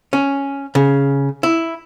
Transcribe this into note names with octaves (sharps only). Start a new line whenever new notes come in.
C#4
C#3
E4